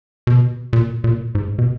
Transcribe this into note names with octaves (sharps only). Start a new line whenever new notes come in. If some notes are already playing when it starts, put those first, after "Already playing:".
B2
A#2
A#2
G#2
B2